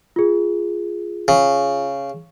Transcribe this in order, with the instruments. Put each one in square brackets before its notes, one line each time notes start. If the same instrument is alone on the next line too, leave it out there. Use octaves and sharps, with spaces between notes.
[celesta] F4 G#4
[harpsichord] C#3